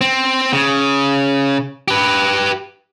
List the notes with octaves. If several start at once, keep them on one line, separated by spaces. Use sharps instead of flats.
C4
C#3
G4 B4